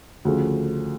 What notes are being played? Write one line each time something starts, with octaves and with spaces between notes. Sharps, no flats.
D2 C#3 F3 A3